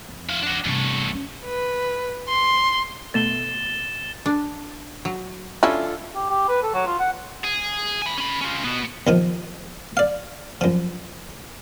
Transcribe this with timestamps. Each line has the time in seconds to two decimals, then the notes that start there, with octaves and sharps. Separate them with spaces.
0.09 F2
0.29 E4 F5
0.43 D4 F#4
0.65 E2 G2 C3 A3
1.11 C4 C#4
1.45 B4
2.28 C6
3.14 B2 A3 A4 A6 E7 G7
4.26 D4
5.05 F#3
5.63 C#4 D4 E4 F4 A4
6.15 G4
6.30 G4
6.48 B4
6.63 A4
6.74 F#3
6.86 F4
6.99 F#5
7.45 G#4
8.02 G#5 B5
8.18 C#4 B5
8.41 C#4 F4
8.64 B2 B3
9.07 D#2 D#3 F3
9.97 D5 F5
10.61 F#2 F3